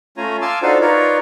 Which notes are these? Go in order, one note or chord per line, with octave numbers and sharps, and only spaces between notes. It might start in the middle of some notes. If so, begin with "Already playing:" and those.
A3 C#4 F4 G#5 A#5
F5 G#5 A5 C6 D6 E6
D4 D#4 F4 F#4 A4 C5
D#4 F4 A#4 B4 C#5 D5